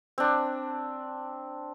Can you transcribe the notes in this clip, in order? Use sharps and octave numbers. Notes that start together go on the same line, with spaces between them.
C4 D4